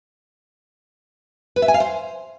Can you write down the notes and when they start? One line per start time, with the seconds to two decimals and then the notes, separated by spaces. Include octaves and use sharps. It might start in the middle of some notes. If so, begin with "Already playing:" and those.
1.56 B4
1.62 E5
1.68 G#5
1.74 F5
1.80 C5